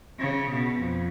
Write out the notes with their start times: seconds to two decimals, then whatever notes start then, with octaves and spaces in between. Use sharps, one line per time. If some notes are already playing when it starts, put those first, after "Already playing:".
0.19 C#3
0.50 B2
0.80 F2